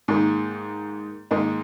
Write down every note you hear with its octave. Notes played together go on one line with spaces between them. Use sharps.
G#2 D#3 A#3
G#2 D#3 A#3 D#4